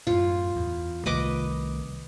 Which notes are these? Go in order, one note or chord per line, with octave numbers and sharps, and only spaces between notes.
F#2 A2 F4
E2
C2 D#3 A3 B4 D#5 D6